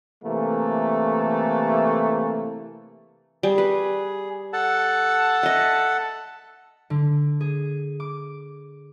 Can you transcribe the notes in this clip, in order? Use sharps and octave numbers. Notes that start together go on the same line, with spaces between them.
C3 E3 A3 A#3
G3 G#4
B4
A4 F#5 A5
D#5 E5
D3
G#4
D6